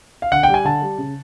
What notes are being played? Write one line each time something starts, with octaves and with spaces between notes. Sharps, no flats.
F5
D3 F#5
G5
G3
G#5
D3 A5
G3
C#3